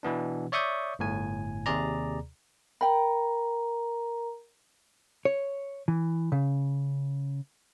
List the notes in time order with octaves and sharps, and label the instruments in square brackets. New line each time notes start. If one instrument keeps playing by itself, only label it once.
[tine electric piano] B2 E3 B3 D4
C#5 D5 E5 C#6 D#6 G6
G1 A2 G#5
D#2 C3 G#4 D5 A#5
[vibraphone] A#4 A#5 [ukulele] G5 B5
[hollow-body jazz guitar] C#5
E3
C#3